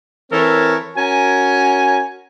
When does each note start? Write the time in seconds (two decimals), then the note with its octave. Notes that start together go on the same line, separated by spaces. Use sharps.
0.32 E3 C4 A4 A#4 C#5
0.97 C#4 F#4 A#4 G#5